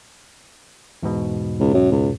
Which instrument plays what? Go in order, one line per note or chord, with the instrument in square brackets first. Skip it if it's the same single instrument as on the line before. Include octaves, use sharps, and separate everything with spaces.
[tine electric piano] E2 G#2 B2
[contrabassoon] C#2
F#2
C#2